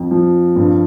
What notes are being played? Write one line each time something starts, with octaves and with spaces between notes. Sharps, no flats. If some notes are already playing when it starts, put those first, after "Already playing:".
Already playing: F2
F3
G2